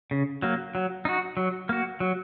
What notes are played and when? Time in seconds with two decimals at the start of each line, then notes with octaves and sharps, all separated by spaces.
0.11 C#3
0.42 F#3 A#3
0.75 F#3
1.05 D#4 F#4
1.37 F#3
1.69 A#3 F#4
2.00 F#3